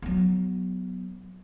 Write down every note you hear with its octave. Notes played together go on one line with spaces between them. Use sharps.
F#3 B3